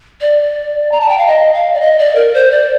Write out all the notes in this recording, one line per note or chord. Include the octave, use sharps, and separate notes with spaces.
D5
A#5
A5
G5
F5
D#5
F5
D5
D#5
D5
A#4
C5
D5